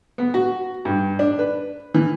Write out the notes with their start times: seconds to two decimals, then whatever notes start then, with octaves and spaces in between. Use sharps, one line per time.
0.18 B3
0.34 F#4
0.85 G2
1.19 D4
1.39 B4
1.94 E3